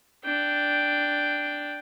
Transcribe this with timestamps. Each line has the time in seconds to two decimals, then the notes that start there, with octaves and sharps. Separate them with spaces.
0.24 D4 G5